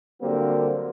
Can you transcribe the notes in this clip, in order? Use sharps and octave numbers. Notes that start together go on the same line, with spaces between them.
D3 F#3 G3 A#3 C4